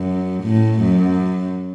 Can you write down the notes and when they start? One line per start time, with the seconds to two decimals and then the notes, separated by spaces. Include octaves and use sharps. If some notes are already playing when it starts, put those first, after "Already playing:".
Already playing: F#2
0.43 A2
0.81 F#2